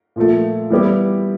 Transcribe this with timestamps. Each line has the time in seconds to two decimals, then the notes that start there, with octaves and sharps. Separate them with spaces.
0.16 A#2 F3 A3
0.70 E3 G3 B3 E4 G4